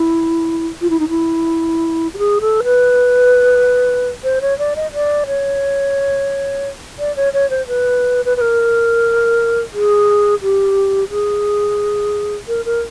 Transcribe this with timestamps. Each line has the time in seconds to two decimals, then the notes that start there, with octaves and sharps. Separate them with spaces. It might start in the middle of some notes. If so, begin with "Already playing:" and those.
Already playing: E4
0.81 F4
0.90 E4
1.00 D#4
1.09 E4
2.14 G4
2.18 G#4
2.41 A4
2.64 B4
4.24 C5
4.41 C#5
4.58 D5
4.76 D#5
4.93 D5
5.27 C#5
6.99 D5
7.16 C#5
7.33 C#5
7.50 C5
7.68 B4
8.25 B4
8.37 B4
8.41 A#4
9.73 G#4
10.42 G4
11.11 G#4
12.48 A#4
12.65 A#4